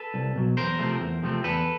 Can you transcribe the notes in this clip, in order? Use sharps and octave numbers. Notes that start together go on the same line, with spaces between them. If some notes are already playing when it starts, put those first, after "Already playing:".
Already playing: A4 B4
C2
B2 F#3
E2 A#4 C5
C3 F3 A3 C4
E2
C3 F3 A3 C4
E2 A4 B4